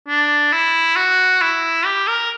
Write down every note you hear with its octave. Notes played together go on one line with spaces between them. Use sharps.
D4
E4
F#4
E4
G4
A#4